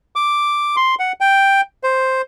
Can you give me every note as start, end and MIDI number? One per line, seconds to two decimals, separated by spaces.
0.16 0.76 86
0.76 0.95 84
0.99 1.12 78
1.20 1.61 79
1.84 2.22 72